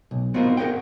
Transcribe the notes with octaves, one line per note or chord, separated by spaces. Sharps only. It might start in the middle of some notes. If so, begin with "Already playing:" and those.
B1
B3 C4 D#4 F4 F#4 A#4
G#4 A#4 D#5 F#5 G5